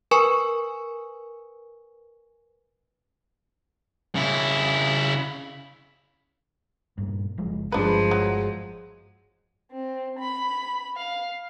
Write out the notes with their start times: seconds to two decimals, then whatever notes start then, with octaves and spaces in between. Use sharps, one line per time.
0.11 A#4 B4 G#5 C#6
4.15 C#3 E4
6.98 G2 A#2
7.38 F#1 F3 G#3
7.72 G1 G2 F3 G#3 D4 G#4 B4
8.11 F#3
9.72 C4
10.19 B5
10.97 F5